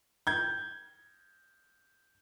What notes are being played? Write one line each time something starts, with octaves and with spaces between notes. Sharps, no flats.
G6 G#6